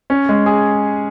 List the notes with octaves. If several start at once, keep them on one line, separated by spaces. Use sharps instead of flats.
C#4
G#3
G#4